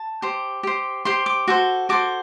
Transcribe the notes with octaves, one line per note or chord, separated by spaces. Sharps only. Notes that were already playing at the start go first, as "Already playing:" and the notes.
Already playing: A5
G4 C5
G4 C5
G4 C5 C6
D6
F#4 A4 C5
F#4 A4 C5 D6